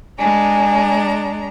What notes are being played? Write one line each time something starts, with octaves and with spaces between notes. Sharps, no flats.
G#3 D4 G#5 A#5